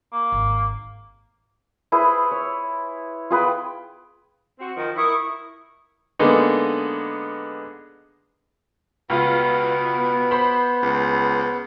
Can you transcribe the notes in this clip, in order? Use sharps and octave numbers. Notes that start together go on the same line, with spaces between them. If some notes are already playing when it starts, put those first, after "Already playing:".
A#3
G#1
E4 G#4 B4 C5
C#5
F4 G#4 B4 G5
C4 F#4
D#3 F3
E4 A#4 C#6 D#6
D3 G#3 A#3 B3 D#4
C#2 B2 B3 F4
C5 B5
C#2